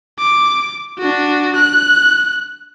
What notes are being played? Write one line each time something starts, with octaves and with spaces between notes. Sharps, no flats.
D6
D4 F#4
F#6